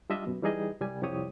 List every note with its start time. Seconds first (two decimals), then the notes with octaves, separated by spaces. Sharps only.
0.10 G3 D4 F4 D#5 E5
0.27 F#2 B2
0.42 E3 G3 D#4 G#4 D#5
0.81 C2 G3 G#5
1.03 C2 F2 G4 C#5 D#6